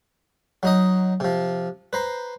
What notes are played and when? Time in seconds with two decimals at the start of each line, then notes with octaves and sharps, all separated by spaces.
0.63 F#3 D#4 D#5
1.20 C3 F3
1.93 B4 C5 A#5